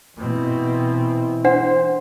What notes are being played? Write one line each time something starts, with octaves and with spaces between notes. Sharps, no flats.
B2 E3 C4
D4 C5 F#5